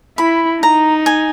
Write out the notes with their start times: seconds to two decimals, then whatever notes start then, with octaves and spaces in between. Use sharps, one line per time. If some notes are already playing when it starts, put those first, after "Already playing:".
0.18 E4 B5
0.63 D#4 A#5
1.06 G#5